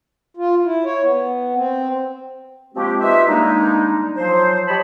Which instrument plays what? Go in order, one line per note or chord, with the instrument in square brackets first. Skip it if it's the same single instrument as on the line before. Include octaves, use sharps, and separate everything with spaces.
[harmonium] F4
E4
C#5
B3
C4
[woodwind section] F3 G#3 A#3 C4 F#4 G4
D#4 F4 G4 B4 E5
D#3 G3 G#3 A#3 D4 D#4
F3 F#3 C5
G4 C5 C#5 D#5 A5 B5